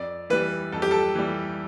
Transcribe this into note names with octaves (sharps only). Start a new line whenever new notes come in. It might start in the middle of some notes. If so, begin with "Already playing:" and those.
Already playing: F2 D5
E3 G3 B4
F2 A4
G4
A4
E3 G3